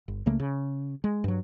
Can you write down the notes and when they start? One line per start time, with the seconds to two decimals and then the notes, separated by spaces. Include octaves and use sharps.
0.08 G1
0.26 C#2 C#3 A3 A#3
0.40 C#3
1.04 G#3
1.24 G2 F#3